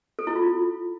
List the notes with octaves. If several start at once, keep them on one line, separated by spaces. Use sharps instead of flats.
A4
E4
F4